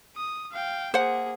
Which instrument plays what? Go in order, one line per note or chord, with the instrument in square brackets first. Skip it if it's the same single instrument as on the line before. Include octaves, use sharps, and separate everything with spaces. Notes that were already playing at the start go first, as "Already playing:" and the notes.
[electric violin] D#6
F5 G5
[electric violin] A#3 G#4 [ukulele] C5 F#5